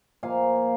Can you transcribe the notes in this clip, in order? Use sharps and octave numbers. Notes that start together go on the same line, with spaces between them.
A#2 F3 A#3 F5 G#5